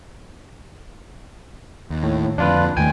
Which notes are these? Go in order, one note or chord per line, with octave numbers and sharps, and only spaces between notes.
D#2
A2
F2 D3 D4 F4 B4
D#2 D#3 A3 G5 G#5